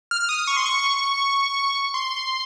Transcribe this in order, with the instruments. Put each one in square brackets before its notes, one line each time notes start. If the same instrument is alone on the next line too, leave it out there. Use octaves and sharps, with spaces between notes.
[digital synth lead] F6
D#6
C#6
C6
C#6
C6